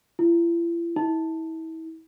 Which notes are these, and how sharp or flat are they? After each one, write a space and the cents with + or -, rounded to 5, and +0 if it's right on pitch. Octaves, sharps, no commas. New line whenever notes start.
E4 +45
E4 -35